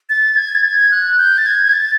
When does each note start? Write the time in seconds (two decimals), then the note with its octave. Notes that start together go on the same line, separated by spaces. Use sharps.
0.09 A6
0.36 G#6
0.55 A6
0.63 G#6
0.91 F#6
1.18 G6
1.38 A6
1.46 G#6
1.67 G#6
1.73 A6